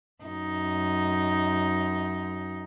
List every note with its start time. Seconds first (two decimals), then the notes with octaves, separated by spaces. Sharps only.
0.24 F#2 D#4